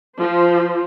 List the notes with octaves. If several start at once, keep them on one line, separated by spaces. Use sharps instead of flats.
F3 C5